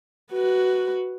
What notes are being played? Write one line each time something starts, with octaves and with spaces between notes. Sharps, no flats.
F#4 B4